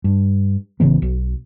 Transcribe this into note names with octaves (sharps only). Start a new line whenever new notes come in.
G2
A1 C#3 E3 B3
B1